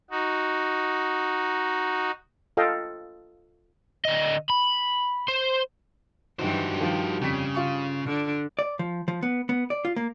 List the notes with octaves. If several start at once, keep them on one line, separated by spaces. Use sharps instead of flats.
D#4 F#4
F4 A4 D#5 F5 G5
D3 D#5
B5
C5
G2 E3 F#3 D#4 F#4 G4 C5
D#3 F3 G3
F2 C#3 B6
F4 C#6
D3 D4
D5
F3
F3
B3
B3
D5
F4
A#3